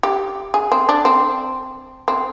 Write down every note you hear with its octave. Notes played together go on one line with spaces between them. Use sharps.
G4
G#4
C4
D4
C4
C4